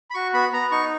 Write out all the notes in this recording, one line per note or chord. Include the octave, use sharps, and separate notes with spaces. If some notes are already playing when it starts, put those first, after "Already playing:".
B5
F#4 C#6
B3 B5
B3 A#5
D#4 C#6